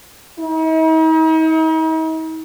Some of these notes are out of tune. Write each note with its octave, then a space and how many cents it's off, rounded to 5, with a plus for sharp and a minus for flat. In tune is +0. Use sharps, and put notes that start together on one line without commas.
D#4 +45